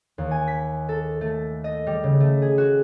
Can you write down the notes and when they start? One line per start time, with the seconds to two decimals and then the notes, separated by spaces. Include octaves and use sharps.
0.18 D#2
0.31 G#5
0.47 B6
0.89 A4
1.21 A3
1.64 D#5
1.87 G3
2.04 C#3
2.20 A3
2.42 G#4
2.58 F#4